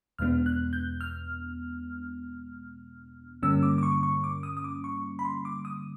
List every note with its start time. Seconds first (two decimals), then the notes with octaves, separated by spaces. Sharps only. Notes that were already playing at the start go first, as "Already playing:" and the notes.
0.19 E2 B2 G#3 B3 D4 F6
0.46 F#6
0.73 G6
1.01 F6
3.43 G2 D3 G3 A#3 C#4 E6
3.63 D6
3.78 D6
3.83 C#6
4.03 C#6
4.24 D6
4.43 D#6
4.57 D#6
4.64 D6
4.84 C#6
5.19 B5
5.25 C6
5.45 D6
5.65 D#6